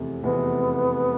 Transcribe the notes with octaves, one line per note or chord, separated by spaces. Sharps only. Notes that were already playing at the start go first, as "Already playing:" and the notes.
Already playing: F1 E2 C3
F1 E2 C3 B3